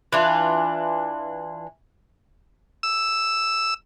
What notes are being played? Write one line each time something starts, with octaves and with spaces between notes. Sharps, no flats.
E3 D4 F4
E6